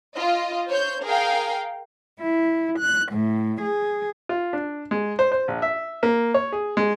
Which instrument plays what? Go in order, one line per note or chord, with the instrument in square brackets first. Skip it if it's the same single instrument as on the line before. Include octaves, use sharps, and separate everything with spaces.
[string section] F4 D#5
C5 C#5 G6
G#4 A#4 F5 G5
[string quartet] E4
F#6
A2
G#4
[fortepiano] F4
D4
G#3
C5
C5
A#1
E5
A#3
C#5
G#4
G#3